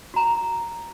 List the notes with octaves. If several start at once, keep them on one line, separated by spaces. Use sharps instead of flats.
F#4 A#5